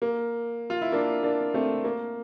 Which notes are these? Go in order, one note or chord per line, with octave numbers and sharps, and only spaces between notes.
A#3
F4
E4
A#3 D4
A#3 D4
A3 C4
A#3